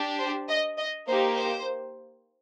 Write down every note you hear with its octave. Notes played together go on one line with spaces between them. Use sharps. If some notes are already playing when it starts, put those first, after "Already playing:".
Already playing: D4 G4
C5
D#5
D#5
A#3 D#4 G4 C5
C5